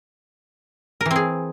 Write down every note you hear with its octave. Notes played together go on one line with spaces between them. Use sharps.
A#4
E3
C4
G#4